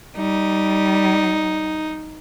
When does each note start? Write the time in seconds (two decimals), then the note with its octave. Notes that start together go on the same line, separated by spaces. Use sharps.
0.17 G3 D#4